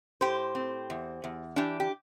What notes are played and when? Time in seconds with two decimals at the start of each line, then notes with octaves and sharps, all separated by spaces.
0.21 A2 G4 C5
0.55 C4
0.90 E2
1.24 E2
1.56 E3 D4 G4
1.80 G4